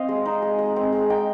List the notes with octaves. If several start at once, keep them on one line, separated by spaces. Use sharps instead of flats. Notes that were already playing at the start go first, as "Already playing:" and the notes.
Already playing: C4 D#5 F5
G#3
D#4
G#3
G#3
C4
G#3
D#4 G5